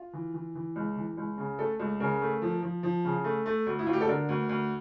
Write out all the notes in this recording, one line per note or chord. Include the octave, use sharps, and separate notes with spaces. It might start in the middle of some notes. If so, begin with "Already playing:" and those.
Already playing: F4
E3
E3
E3
C#2
E3
C#2
C#3
A3 A4
C#2
C#3 A#4
A3
F3
F3
F3
C#3
A3
A3
D2
E4
D2 F4
G4
A4
D3 A#4
D2
D2